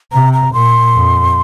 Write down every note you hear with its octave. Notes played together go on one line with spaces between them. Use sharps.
C3 A#5
A#5
A#2 C6
F2